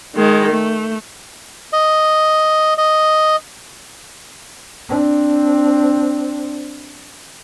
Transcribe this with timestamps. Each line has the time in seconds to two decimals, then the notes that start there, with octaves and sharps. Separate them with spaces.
0.16 D#3 G#3
0.52 A3
1.73 D#5
2.78 D#5
4.89 C4 D4